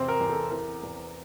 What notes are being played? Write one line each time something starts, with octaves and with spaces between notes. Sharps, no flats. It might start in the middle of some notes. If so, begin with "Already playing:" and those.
Already playing: E2 C3 C4 C5
A#4
E2
A4
E3 A#4
E2